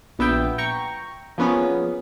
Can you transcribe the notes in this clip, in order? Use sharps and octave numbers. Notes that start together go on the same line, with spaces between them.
A#1 B3 E5 G5
G5 A#5 C#6
F3 A#3 B3 C#4 G#4